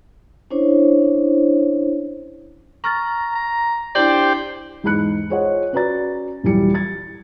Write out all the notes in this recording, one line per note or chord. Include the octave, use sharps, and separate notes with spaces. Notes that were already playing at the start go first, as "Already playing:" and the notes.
C#4 D4 E4 C5 C#5
A#5 C#6 F6 A6
A#5
D4 E4 G4 C5 D5 G5 F#7
E2 G#2 G#3 B5 F#6 C#7
F4 G#4 C5 C#5 D#5 F#5
C#4 F#4 B4 D5 A#5 A6
D#1 F#2 E3 F#3 G3 C#7
G#6 A6